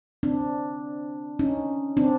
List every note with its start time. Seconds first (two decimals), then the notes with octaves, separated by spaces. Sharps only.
0.23 C4 D4
1.39 C#4 D#4
1.97 C4 D4